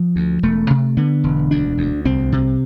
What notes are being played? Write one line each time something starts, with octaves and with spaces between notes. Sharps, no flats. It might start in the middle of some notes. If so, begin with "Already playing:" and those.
Already playing: F3
D2
E1 A3
C3
D3 B3
E1
D2 D4
D2
C2 C4
C3